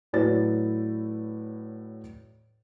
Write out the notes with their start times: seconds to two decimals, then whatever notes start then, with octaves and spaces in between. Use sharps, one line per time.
0.13 A2 F#3 E4 B4 D5 A6